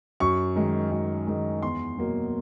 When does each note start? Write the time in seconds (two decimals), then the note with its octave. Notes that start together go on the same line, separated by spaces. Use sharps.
0.20 F#2 C#6
0.56 D#3 G#3
0.91 F#2
1.27 D#3 G#3
1.63 E2 C6
1.98 B2 F#3 A#3